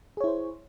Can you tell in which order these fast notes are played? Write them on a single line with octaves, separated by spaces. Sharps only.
G#4 C#5 E4 C5